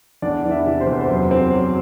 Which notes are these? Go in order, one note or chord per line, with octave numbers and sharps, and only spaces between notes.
E2 D4 D5
E3
E4 E5
C3
C5
E2 B4
C5
F#2
C4
F#3